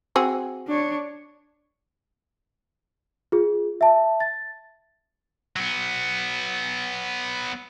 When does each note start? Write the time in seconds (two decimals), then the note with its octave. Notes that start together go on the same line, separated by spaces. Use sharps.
0.16 C4 F#4 G#4
0.68 D4 C#5
3.32 F4 G#4
3.81 E5 A5
4.20 A6
5.56 F#3 B3